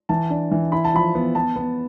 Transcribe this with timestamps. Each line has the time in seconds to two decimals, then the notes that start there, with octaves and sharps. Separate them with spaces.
0.09 E3 A5
0.30 D4
0.51 E3
0.72 E4 B5
0.84 A5
0.94 F3 B5
1.15 B3
1.35 B3 A5
1.56 B3